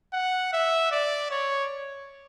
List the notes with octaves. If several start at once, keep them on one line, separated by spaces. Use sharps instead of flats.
F#5
E5
D5
C#5